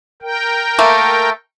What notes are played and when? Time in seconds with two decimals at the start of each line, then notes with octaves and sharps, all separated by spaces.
0.22 A#4 G5
0.79 A3 A#3